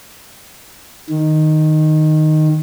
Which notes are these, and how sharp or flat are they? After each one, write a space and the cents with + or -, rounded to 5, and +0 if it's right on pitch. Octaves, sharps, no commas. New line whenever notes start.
D#3 -5